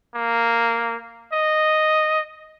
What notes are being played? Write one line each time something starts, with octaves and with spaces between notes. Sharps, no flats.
A#3
D#5